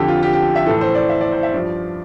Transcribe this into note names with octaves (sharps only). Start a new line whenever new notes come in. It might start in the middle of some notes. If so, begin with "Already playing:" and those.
Already playing: F2 D3 F3 G4 A4
F4
G4
G4
E5
A2 E3 A4
C5
D5
E5
D5
C5
E5
G2 F3 D5